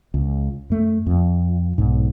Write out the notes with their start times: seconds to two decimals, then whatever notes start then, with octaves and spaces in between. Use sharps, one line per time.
0.14 C#2
0.70 F#2 A3
1.06 F2
1.78 B1 G#2